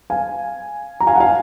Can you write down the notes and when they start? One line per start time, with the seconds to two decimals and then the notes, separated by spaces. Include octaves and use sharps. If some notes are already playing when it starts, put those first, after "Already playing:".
0.10 F5 G#5
1.00 A#5
1.07 F5 G#5
1.16 F#5
1.20 F5 G#5